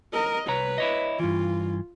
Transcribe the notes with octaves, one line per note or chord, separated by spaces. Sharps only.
A#4 D#5
C2 B4 C#5 A#5
E4 C#5 D#5
G2 E3 F4